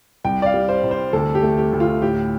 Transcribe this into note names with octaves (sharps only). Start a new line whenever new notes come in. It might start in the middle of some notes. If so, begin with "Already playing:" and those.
C2 G5
D5
F5
G3
C5
C2
C5
D2 A4
G4
A3
G4
D2
F4
A2 G4